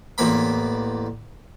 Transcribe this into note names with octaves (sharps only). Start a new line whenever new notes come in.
A1 E2 A#3 B5